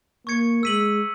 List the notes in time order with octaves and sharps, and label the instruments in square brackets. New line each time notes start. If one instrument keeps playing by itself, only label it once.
[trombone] A#3 [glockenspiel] C#6 G#6 C#7
[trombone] G#3 [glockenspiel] E6 B6 D#7 F#7